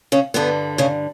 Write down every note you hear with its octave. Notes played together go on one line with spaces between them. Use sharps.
C#3 C#4
G2 D3 G3 B3
C#3 C#4